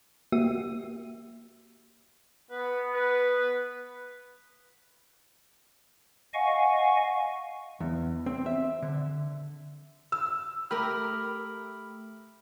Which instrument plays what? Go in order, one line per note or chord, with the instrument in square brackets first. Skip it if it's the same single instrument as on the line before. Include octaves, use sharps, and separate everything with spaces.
[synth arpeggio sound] A#3 F#4 G4 E5 D#7
[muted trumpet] B3 [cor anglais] B4
[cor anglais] B4
[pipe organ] D#5 F5 F#5 G#5 C#6
[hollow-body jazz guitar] E2
C4
E5
D3
[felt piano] E6
[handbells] A3 B5 F6 [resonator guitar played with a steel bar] G4 A#4